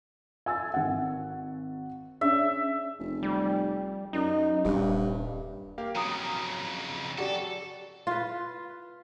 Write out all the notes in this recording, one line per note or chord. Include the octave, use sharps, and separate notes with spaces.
G#5 E6 A6
G#1 F#5
C#4 D4 G#4 E5
F1
G3
F#2 D#4
D#1 G2
A#3 G4 F5
F2 C#3 F#3 A#5 D#6
F#4 G4 A4 D5
F4 B4